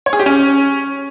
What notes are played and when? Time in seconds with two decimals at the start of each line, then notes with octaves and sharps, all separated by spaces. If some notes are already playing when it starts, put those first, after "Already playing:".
0.06 C#5
0.13 G#4
0.19 G4
0.26 C#4